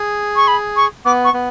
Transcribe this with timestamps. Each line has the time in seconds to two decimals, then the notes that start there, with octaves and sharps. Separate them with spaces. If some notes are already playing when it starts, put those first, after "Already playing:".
Already playing: G#4
0.36 C#6
0.48 B5
0.76 C#6
1.05 B3 D6
1.25 C#6
1.34 B3